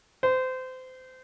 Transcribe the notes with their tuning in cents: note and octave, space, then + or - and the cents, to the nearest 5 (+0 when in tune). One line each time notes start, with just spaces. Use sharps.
C5 -25